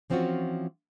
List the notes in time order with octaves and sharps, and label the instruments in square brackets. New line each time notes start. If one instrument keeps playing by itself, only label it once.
[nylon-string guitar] E3 F3 C4 C#4 F4 F#4